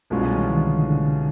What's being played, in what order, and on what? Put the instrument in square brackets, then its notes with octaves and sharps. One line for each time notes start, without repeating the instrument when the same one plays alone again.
[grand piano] C2 B2 G#3 C#4 F4
[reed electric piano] A3
E3
D#3
D3
D3
D3